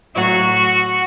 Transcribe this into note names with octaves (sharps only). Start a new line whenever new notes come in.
A2 F#3 F#4